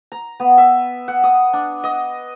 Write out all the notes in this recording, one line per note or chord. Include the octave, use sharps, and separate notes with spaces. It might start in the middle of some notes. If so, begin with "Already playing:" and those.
A#5
B3
E5
F#5
D#6
D4
D#5